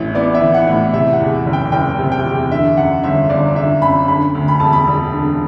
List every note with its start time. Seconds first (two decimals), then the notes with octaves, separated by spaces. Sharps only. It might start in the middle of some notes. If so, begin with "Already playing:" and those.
Already playing: A1 A2 E3 E5
0.15 B3 D5
0.34 E5
0.41 E3
0.54 F#5
0.67 A2
0.93 C3 E5
1.13 F#5
1.20 E2
1.46 F#1
1.53 G5
1.72 F#1 G5
1.99 C3
2.12 G5
2.25 E2
2.51 D3 E5
2.77 F#2 F#5
3.03 G1 E5
3.30 G1 D5
3.56 D3 E5
3.82 F#2 B5
4.08 D3 B5
4.35 D2
4.48 B5
4.60 E1 A5
4.73 B5
4.87 E1
5.13 D3